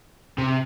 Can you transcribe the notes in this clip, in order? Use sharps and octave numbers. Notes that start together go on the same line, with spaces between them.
C3